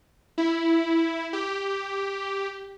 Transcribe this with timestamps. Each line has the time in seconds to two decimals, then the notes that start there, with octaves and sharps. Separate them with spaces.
0.38 E4
1.33 G4